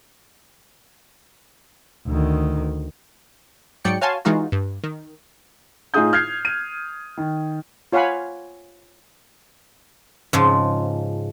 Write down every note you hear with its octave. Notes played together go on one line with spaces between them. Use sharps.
D2 D#3
G#2 F#3 D5 G5 C#7
F#4 C#5 F5 G#5 A5 C6
E3 G#3 D#4 F4 F#4
G2
D#3
A2 D#4 F4 G#4 D#6 G6
F6 G6 G#6 C7
D#7
D#3
F4 C#5 F5 F#5 G#5 B5
G#2 C#3 F3